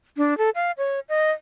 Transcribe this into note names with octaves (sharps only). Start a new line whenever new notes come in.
D4
A4
F5
C#5
D#5